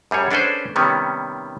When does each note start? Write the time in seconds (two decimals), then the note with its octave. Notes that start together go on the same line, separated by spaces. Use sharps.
0.11 F#2 G3 G#4 C#5
0.31 C#4 D4 G#4 A4 B4 C5
0.76 C3 D#3 G3 B3 C#4